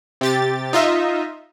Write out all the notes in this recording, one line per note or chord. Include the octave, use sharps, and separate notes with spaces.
C3 G4 A6
D#4 F4 D#5 E5